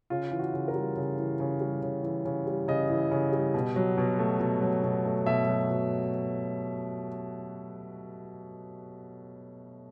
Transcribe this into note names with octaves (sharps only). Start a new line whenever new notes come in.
C#3 F4
E3
F#4
C#3
A#4
G3
C#3
E3
C#3
G3
C#3
E3
C#3
G3
C#3 D#5
E3
C#3
G3
B2
F#3
B2
A3
B2
F#3
B2
A3
B2 E5
F#3
B2